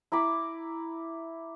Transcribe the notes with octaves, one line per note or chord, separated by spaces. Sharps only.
E4 A#5 B5 D6